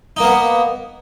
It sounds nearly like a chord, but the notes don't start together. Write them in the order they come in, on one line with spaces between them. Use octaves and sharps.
D#4 A#3 B3